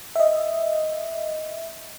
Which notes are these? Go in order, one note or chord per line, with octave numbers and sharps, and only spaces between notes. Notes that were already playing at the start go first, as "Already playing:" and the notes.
D#5 E5